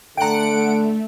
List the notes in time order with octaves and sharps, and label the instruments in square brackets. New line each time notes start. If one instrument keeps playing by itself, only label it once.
[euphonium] D3 [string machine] A3 [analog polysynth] F#5 D7 [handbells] G5 A#5